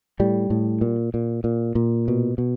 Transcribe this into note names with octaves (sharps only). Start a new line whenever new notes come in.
A2 G3
A2
A#2
A#2
A#2
A#2
B2
B2